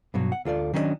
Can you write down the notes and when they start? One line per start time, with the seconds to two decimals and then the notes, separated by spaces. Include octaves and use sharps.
0.14 G2 B2 F#3
0.32 F#5
0.45 D2 F4 A4 D5
0.74 D#3 F#3 C#4 D4 G#4 D#5